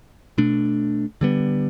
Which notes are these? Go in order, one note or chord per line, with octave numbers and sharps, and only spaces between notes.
B2 A3 D4
D3 G3 B3